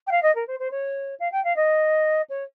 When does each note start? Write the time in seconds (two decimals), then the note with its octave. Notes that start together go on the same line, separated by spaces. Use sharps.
0.06 G5
0.11 F5
0.22 D#5
0.35 A#4
0.47 C5
0.59 C5
0.71 C#5
1.19 F5
1.32 G5
1.44 F5
1.56 D#5
2.29 C#5